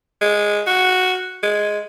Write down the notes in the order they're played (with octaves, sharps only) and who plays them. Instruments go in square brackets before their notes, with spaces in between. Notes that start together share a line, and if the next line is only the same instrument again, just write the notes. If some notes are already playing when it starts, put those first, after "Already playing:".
[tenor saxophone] G#3
F#4
G#3